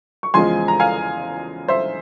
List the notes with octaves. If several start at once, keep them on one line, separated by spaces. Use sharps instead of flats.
C#6
E2 C#3 F3 G#3 G#5 C6
A#5
F5 G#5
C5 E5